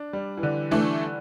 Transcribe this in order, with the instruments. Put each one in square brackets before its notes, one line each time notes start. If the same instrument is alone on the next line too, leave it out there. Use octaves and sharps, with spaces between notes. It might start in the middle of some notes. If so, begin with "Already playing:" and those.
Already playing: [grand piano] D4
G3
E3
D3
[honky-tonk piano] E3 A3 D4